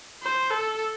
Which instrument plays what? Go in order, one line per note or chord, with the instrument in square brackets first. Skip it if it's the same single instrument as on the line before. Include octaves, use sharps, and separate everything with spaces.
[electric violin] C5
A4